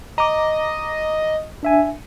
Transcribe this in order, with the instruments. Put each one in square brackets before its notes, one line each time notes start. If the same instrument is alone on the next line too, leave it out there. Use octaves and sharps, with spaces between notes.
[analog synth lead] D#5 [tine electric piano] A#5 D6
[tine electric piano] D4 E5 G#5